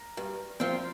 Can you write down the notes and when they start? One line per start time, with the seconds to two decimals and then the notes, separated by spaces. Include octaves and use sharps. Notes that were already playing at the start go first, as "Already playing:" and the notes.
Already playing: A#4
0.17 G2
0.60 F3 C4